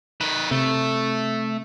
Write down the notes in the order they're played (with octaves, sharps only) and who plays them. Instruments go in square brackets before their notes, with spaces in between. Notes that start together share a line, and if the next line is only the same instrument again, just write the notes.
[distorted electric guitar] D#3 B4
[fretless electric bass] C3 [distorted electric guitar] A3